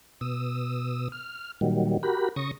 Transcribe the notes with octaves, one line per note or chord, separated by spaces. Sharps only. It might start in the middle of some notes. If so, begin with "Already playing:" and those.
B2 D#6 E6
F6
A#2 D#3 F#3 G3
F#4 G4 A#4 B5
C#3 C#6 D#6 A#6